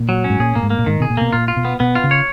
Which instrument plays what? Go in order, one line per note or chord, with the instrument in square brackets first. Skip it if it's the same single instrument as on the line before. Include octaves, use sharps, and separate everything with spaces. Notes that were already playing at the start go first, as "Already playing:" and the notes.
Already playing: [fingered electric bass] A#2
[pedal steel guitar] F#3
C#4
[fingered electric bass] G#2
[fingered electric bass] A#2 [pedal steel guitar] G#4
[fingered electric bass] A#2 [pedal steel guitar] A#3
[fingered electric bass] G#2
[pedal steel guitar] A#3
[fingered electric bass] A#2
[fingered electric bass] G#2 [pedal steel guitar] D#3
[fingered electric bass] B2 [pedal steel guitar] G#4
[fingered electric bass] A#2
[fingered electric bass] B2 [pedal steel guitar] A#3
[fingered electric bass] A#2 [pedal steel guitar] F4
[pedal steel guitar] F4
[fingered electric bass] B2
[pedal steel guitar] B3
[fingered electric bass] B2 [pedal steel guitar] B3
[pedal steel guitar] F4
[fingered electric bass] C#3
[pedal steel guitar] C#5